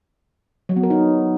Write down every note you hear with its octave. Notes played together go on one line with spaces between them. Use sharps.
F#3
B3
A#4
D#4